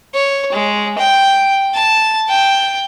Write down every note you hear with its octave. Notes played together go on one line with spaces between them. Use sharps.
C#5
G#3
G5
A5
G5